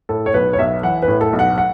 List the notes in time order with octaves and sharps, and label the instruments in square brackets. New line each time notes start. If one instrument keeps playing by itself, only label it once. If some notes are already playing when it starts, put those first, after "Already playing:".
[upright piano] A2 A4
C#5
B1 B4
C#5
B1 E5
E3 F#5
B4
A2
A4
B1
F#5
F#5